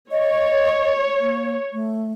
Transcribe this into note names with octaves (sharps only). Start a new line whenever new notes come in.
C#5 D#5
A#3
A3